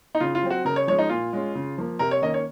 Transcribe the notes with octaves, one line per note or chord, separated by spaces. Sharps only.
D#4
C#3 F4
F4
F#3 C4
F#4
C#3 A#4
C#5
F3 G#3 C#4 C#5
D#4
A#2 F4
G#3 C#4
C#3
F3 A#3
C3 A#4
C#5
D#3 A#3 C#4 D#5
C#5